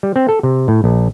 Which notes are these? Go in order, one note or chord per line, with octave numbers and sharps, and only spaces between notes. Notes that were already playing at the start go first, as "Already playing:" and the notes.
G3
C4
A4
C3
A2
A#1